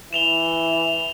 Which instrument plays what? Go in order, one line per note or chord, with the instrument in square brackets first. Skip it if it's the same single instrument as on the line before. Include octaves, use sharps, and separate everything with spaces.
[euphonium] E3 [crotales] E7 F7 G7